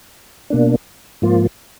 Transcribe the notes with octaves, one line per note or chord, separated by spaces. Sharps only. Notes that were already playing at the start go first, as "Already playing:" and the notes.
B2 A#3 D4
G#2 F3 A#3 F4